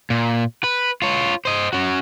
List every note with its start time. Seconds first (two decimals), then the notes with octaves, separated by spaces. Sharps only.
0.10 A#2
0.64 B4
1.02 F4 C#5
1.45 C5 D#5
1.73 C#4 F#4